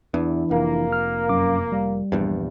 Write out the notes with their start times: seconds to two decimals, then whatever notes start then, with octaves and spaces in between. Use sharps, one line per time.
0.14 E2 E3 D4 E4
0.51 F1 A#3
0.93 F6
1.29 F#2 D6
1.72 G3
2.12 A#1 E2 G2